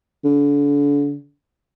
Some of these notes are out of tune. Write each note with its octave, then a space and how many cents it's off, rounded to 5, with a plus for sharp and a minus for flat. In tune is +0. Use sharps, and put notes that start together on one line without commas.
D3 -35